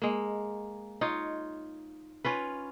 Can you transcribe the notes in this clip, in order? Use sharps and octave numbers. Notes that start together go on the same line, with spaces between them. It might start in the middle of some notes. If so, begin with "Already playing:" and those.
G#3 A#3
D#4 F4 C#5
C#4 F4 B4